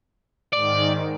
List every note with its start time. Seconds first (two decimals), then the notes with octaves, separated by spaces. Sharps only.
0.53 G#2 D#3 D5